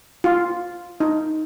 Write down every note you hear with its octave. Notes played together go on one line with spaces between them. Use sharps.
F4
D#4